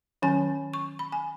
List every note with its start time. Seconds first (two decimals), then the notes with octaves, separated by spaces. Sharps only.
0.22 D#3 F#3 C#4 G#5
0.74 C#6
0.99 B5
1.12 G#5